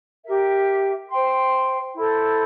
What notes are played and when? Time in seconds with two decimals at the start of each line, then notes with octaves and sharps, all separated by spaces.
0.23 G4 A#4 E5
1.09 C5 G5 C6
1.95 E4 A4 C5